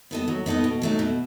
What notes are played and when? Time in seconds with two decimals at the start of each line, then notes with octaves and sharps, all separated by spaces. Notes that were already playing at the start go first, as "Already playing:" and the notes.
0.11 B3 D#4 A4 D#5
0.28 F#3
0.46 B3 D#4 A4 D#5
0.64 B2
0.82 F#3 A3 D#4
0.99 B2